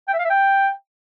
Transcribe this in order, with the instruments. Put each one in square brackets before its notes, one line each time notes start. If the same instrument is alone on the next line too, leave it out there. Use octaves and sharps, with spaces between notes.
[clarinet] G5
E5
F5
E5
G5